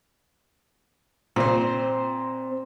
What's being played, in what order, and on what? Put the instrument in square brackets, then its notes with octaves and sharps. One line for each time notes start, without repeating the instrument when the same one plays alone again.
[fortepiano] A#2 [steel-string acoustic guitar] C4 C5